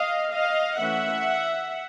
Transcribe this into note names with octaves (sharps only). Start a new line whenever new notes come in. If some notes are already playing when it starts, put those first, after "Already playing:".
Already playing: D#5 F5
D#5 F5
E3 A3 C#4 E5 F#5